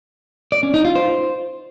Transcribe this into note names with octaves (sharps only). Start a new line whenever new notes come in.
D5
C#4
D#4
F4
C5